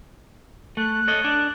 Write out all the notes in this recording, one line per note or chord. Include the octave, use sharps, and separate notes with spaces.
A3 F#6
A4 C#5 D#5
D4